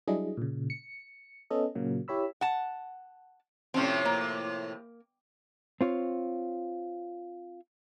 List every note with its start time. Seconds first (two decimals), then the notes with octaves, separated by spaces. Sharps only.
0.08 F#3 G3 D4 E4 G#4 D#5
0.37 A#2 C#3
0.70 C#7
1.50 B3 C#4 A4 D#5
1.75 A#2 C#3 F#3 A#3
2.08 E4 G4 C#5 B5 E6
2.41 F#5 A5
3.74 A2 C3 F3 C4 C#4
4.05 A#3
5.81 C4 F4 C#5